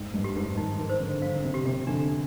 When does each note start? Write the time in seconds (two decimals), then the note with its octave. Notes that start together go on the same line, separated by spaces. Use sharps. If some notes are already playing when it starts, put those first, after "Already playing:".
Already playing: G#2 G5
0.14 G2
0.24 G4
0.36 G#2
0.57 D#3 D#4
0.79 D#3
0.90 C5
1.00 D3
1.22 D3 F5
1.43 C3
1.54 G4
1.65 C3
1.87 D3 D4